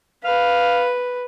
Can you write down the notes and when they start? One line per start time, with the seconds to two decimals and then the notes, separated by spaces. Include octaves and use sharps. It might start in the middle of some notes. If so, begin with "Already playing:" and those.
0.24 B4 F5